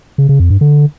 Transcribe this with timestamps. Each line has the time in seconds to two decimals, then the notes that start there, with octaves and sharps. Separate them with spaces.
0.18 C#3
0.29 C#3
0.40 F2
0.50 G2
0.61 D3